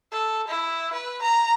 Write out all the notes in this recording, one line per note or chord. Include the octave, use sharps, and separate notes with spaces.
A4
E4
B4
A#5